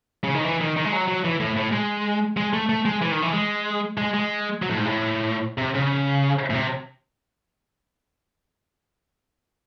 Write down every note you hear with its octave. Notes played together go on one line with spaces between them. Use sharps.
C#3
D#3
E3
D#3
D#3
G#3
F#3
F#3
E3
A2
A2
G#3
G#3
A3
A3
G#3
E3
D#3
E3
G#3
G#3
G#3
F#3
A2
G#2
A2
C3
C#3
A2
C3